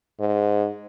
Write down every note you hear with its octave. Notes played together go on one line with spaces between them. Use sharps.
G#2